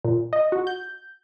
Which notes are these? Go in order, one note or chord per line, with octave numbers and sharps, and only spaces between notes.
A#2
D#5
F#4
G6